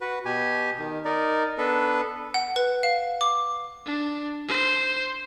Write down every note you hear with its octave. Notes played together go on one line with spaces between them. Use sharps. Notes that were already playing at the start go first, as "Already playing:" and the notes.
F#4 B4
B2 G4 G#5
D#3
D#4 A#4 D5
B3 D4 A4 B4
F#5
B4
F5
D6
D4
C5